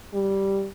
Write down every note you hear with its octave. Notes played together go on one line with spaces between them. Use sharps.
G3